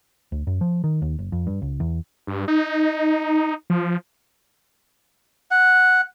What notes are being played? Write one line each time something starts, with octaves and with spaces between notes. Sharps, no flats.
D2
F#2
F3
D#3
D#2
F#1
F2
G2
C#2
E2
G2
D#4
F3
F#5